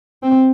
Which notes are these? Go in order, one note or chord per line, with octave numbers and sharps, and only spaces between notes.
C4